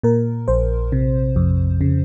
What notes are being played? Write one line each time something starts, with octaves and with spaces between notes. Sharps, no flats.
A#2 A#4
A#1 C5
C3
F2
C#3